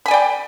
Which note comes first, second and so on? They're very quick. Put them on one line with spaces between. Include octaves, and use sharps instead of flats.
B5 G#5 D5 G5